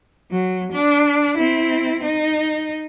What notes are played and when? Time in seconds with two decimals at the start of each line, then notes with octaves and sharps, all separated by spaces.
0.32 F#3
0.72 D4
1.37 C4 E4
2.03 D#4